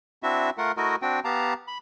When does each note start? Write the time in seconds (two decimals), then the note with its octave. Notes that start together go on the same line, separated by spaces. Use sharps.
0.23 C4 D4 E4 F#4 E5
0.58 A3 F4 A#4 F#5
0.77 A3 E4 F#4 A#4 D#5
1.02 C4 D4 F#4 G5
1.25 B3 G4 F5 A5 A#5
1.68 B5